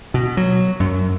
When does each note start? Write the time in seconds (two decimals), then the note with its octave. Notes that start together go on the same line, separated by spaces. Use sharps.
0.14 B2
0.37 F#3
0.80 F#2